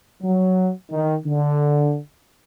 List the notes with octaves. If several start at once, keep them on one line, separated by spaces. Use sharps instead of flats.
F#3
D#3
D3